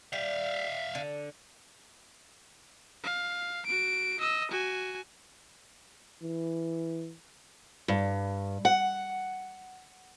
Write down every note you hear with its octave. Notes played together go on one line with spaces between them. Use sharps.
G3 E5 F5
D3
F5
F#4 D7
D#5 E6
F#4 G#5
E3
G2
F#5